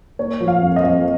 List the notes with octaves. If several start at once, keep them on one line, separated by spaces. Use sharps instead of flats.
A#3 C#5
F3
F5
F2
D#5
F2